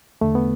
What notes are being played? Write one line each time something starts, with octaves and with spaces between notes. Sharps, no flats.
E2 D3 A3
B3